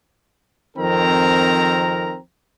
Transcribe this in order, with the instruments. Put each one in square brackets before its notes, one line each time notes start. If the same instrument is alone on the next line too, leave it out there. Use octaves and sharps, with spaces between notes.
[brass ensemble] F2 D#3 C4 A#4 A#5